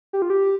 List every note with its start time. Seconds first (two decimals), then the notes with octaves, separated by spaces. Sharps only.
0.13 G4
0.22 F4
0.30 G4